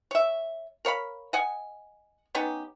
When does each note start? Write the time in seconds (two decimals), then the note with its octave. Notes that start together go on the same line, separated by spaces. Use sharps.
0.11 C#5 E5
0.85 A#4 C#5 F5 B5
1.33 D#5 F#5 G#5
2.35 B3 C#4 D#4 G4